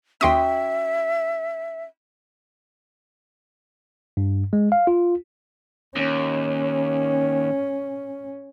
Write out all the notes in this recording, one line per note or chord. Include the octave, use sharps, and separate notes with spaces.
D#2 C#4 F#4 E5 G5 C6 D#6
G2
G#3
F5
F4
D#2 C#4